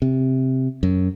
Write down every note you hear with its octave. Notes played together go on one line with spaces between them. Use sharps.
C3
F#2